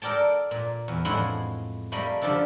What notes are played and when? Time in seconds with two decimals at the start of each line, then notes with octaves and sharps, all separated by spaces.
0.02 A4 A#4 D5 G5 A5
0.51 A#2
0.88 E2
1.05 F2 A2 G#3 E4 F#5 C6
1.92 G3 A3 A#3 D#5 B5
2.22 D3 F3 G3 D4 A4